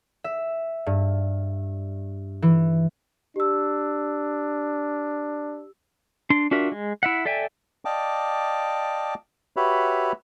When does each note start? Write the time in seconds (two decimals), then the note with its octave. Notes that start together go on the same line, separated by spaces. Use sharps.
0.24 E5
0.86 G2
2.42 E3
3.36 D4 G4 E6
6.30 D4 C6
6.51 D4 F4 F#4 A#4 E5
6.72 G#3
7.03 E4 E5 F#5
7.25 A4 D5 E5 G5 G#5
7.85 D5 D#5 F5 G5 A5 D6
9.57 F#4 G4 B4 C#5 E5 B5